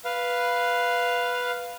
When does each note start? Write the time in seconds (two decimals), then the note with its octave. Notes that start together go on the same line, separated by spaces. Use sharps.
0.05 B4 F5